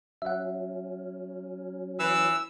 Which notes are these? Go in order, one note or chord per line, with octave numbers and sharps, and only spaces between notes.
F#3 C#4 E5 F#5
E3 E6